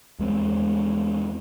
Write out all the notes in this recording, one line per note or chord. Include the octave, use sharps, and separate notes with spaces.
E2 G#3 A3 C4